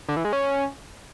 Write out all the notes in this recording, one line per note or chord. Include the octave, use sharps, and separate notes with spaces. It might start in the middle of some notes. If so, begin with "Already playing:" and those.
D3
E3
G#3
C#4